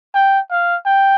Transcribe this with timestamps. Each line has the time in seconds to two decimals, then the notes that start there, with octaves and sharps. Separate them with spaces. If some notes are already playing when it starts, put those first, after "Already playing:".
0.14 G5
0.51 F5
0.86 G5